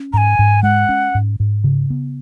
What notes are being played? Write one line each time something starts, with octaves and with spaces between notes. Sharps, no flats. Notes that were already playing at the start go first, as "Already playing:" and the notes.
Already playing: C#4
G#2 G#5 A#5
G#2
G#3 F#5
C#4
G#2
G#2
C#3
B3